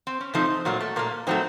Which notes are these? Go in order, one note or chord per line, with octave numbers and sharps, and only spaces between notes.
C4
C#4
C3 F3 A3 C4 D#4
A#2 F#3 A3 A#3
A3
A#2 A3 A#3
A2 F#3 A3 C4 D#4